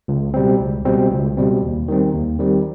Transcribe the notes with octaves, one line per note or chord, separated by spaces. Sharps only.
C#2
B2 G3 C4
C#2
B2 G3 C4
C#2
B2 G3 C4
D#2
D#3 G3 C4
D#2
D#3 G3 C4